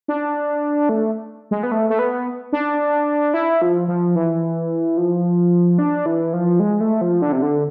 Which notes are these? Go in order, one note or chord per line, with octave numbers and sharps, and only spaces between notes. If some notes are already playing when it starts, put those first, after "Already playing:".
D4
A3
G#3
B3
A3
A3
B3
D4
E4
F3
F3
E3
F3
D4
E3
F3
G#3
A3
F3
D3
C3
D3